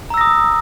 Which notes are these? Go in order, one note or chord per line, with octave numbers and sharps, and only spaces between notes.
A#5 D#6 E6 A#6